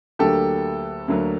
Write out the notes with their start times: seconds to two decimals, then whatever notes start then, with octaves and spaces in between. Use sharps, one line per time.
0.19 D2 D3 F#3 A#3 G4 A4
1.08 D2 D3 F#3 A#3